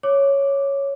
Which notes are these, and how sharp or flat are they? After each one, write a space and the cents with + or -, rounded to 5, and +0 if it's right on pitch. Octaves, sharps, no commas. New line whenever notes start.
C#5 +0 D6 +0